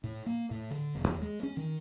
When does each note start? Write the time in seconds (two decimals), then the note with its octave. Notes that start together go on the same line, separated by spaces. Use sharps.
0.04 A2
0.26 A#3
0.51 A2
0.71 D3
0.95 E1
1.07 D#2
1.22 G#3
1.43 C#4
1.57 D#3